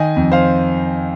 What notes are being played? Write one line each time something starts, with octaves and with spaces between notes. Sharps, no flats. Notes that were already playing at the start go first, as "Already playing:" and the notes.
Already playing: D#3 D#5 G#5
F2
C5 F5